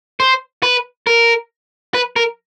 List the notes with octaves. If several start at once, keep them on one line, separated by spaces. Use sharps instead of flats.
C5
B4
A#4
B4
A#4